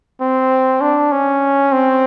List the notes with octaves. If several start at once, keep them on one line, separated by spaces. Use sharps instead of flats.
C4
D4
C#4
C4